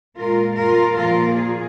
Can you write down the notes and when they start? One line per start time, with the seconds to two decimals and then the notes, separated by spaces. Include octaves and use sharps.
0.18 A#2 G#3 F4 A#4
0.58 F4 A#4
0.97 A#2 F3 A#3 F4 A#4
1.38 G#4